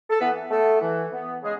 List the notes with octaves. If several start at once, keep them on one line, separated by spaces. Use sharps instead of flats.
A4
E3 B3 B4
A3 B3 A4
E3
B3
C#3 G#3 G#4